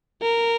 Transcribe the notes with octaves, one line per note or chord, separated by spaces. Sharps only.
A#4